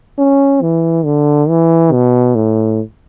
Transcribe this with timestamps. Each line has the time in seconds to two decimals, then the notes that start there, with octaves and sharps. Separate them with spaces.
0.18 C#4
0.62 E3
1.05 D3
1.49 E3
1.92 B2
2.35 A2